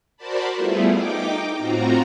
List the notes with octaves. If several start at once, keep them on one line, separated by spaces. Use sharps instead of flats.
F#4 A#4 C5 D5 A5 B5
G3 A3 B3 E4 F4 G#4
D#4 G5 D6
A2 C4 F4 F#4 A#5